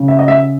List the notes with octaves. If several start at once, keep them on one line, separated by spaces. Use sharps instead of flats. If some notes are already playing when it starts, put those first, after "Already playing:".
Already playing: C#3
E5
D#5
E5